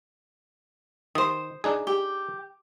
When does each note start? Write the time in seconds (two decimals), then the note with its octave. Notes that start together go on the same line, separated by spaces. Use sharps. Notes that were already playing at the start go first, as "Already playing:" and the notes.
1.15 D#3 C5 D#6
1.64 D4 D#4 G#4
1.87 G4